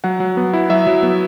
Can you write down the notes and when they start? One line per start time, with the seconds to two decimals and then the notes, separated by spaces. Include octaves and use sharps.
0.04 F#3 F#5
0.20 F#3
0.37 B3
0.53 E4
0.70 F#3 E5
0.87 F#3
1.03 B3